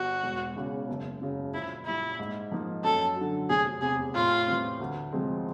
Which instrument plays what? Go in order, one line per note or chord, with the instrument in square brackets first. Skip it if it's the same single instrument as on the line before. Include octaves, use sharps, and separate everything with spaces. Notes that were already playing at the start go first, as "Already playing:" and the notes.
Already playing: [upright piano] G1 [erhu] F#4
[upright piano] E1
E2 C#3
F#1
F#2 C#3
[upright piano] A#1 [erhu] E4
[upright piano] A#2 G3 [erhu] E4
[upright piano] G#2
F3 A#3 D#4
[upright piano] F#2 [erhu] A4
[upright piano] D3 F#3
[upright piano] F1 [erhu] G#4
[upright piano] E2 C3 [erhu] G#4
[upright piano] A2 [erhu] F4
[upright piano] E3 G3 C4
D2
C3 F3 G#3 C4